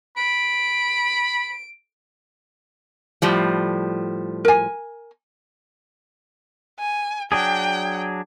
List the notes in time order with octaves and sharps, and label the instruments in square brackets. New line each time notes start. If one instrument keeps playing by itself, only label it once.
[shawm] B5 [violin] D7
[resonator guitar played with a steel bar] A2 F3 G3
[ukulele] A#4 G#5
[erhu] G#5
[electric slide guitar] F#3 D4 G#4 [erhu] G5